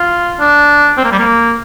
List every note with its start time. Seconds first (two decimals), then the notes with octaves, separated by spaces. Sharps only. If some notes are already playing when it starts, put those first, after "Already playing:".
Already playing: F4
0.40 D4
0.97 C4
1.05 A#3
1.12 G3
1.19 A#3